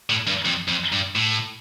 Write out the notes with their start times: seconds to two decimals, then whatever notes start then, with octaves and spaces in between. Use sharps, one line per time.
0.10 A2
0.27 G2
0.45 F2
0.68 F2
0.92 G2
1.15 A2